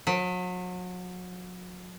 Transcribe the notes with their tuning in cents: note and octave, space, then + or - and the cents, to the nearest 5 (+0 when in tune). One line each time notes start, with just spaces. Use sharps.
F#3 -35